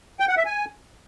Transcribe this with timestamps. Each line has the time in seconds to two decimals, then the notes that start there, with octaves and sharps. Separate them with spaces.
0.20 G5
0.29 F#5
0.37 E5
0.46 G#5